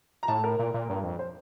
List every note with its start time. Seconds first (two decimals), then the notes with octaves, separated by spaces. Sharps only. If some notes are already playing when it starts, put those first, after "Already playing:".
0.23 A#5
0.28 A2 A5
0.44 A#4
0.59 A#2
0.74 A#2
0.90 G2
1.04 F2
1.19 C5